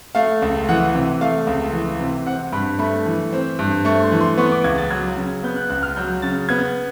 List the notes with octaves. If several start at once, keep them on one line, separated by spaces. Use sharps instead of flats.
A3 F5
C#2
E3 F#5
C3
A3 F5
C#2
E3
C3
C4 F#5
G2 B5
A3 B5
E3
C4
G2
A3 C#6
C6
E3
C6
B3 C#6
D6
C#2 G#6
A6
F#3 G#6
C#3
B3 G6
F#6
C#2 F#6
F6
F#3 G6
C#3 A6
B3 G#6